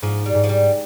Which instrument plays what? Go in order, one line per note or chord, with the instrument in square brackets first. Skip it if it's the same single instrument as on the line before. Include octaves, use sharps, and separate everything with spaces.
[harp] G#2 [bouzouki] F3
[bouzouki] G3
[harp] G#2
[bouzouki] F3
G3